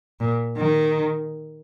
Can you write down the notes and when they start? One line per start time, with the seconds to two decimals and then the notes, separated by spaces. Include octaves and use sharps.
0.20 A#2
0.57 D#3